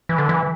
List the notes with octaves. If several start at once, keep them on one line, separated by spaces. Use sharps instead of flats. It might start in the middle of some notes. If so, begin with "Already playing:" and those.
E3
D3
E3